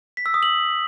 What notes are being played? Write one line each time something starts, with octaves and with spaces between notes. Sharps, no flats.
B6
E6
D#6
F#7